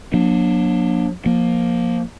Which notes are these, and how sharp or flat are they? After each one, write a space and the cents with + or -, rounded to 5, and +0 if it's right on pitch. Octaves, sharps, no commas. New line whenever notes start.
F#3 -35 A#3 +40 D4 +0
F3 +15 A#3 +10